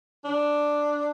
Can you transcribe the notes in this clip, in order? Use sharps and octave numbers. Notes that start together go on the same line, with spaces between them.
D4